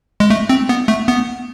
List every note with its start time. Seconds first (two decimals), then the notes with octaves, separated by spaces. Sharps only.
0.20 G#3
0.30 A3
0.49 C4
0.69 B3
0.88 A3
1.08 B3